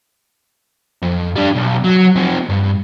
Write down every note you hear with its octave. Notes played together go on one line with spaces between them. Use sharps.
F2
G3 D4
B1
F#3
C3 F3
G2